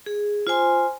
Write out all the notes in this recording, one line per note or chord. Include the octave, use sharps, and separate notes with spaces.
G#4
F4 C5 G#5 C6